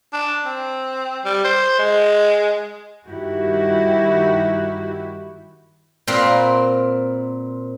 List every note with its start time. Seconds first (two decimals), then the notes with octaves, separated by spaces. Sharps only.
0.13 D4
0.45 C4
1.25 G3
1.44 C5
1.79 G#3
3.07 G2 D#3 E4 F#4 G4
6.07 A#2 C4 A#4 B4